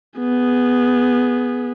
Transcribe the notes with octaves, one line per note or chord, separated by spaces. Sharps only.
B3 G#4